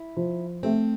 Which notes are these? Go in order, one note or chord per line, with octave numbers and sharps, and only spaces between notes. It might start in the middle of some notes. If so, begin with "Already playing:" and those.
Already playing: E4
F3
A3 C4